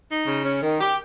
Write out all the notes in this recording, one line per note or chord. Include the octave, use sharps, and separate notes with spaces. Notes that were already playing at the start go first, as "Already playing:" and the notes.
D#4
C#3
C#4
D#3
G4